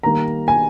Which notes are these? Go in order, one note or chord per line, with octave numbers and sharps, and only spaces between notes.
D#3 G3 A#3 A#5
G#5